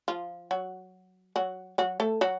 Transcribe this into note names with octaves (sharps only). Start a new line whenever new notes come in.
F3 F4
F#3 F#4
F#3 F#4
F#3 F#4
A3 A4
F#3 F#4